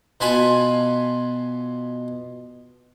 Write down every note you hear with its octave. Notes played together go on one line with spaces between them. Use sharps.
B2 F4 G#5 A5 B5